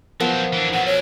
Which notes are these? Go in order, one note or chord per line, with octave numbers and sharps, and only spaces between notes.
F3 F#3 B3 A#4 C5
E3 D4
B2 F#3 F#5
C#5